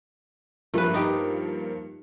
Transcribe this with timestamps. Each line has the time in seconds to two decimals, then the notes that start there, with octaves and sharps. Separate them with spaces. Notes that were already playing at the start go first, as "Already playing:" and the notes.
0.74 G2 F3 A3 A#3 B4
0.94 D#4 G4